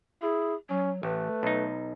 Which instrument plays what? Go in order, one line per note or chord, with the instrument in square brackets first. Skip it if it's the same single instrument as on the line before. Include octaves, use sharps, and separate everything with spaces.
[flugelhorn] E4 [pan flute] G#4
[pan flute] F#3 [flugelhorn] C#4
[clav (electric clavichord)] A1 [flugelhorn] A3 [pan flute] B4
[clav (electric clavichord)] B1 D#4